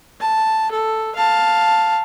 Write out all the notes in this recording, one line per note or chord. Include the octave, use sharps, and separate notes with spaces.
A5
A4
F5 A5